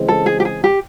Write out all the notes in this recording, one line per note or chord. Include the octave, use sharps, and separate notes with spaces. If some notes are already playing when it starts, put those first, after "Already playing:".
Already playing: C#3 E3 G#3 C4
A4
G#4
G4
G#4
G4